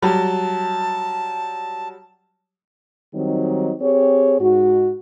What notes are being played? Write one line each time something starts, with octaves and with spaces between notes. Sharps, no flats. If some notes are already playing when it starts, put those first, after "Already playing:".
F#3 G3 A5
D#3 F#3 G3 C4 D#4
C4 G4 G#4 C#5
G#2 F#4